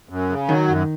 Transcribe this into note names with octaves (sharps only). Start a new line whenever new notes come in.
F#2
C#3
D#3 F#3
F#2